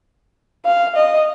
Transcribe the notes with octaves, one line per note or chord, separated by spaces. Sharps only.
F5
D#5